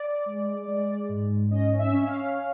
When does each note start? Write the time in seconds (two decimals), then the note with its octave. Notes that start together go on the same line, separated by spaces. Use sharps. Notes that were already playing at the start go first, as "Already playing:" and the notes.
Already playing: D5
0.26 G#3
0.68 G#3
1.09 G#2
1.51 C#4 D#5
1.79 E5
1.92 C#4
2.06 F5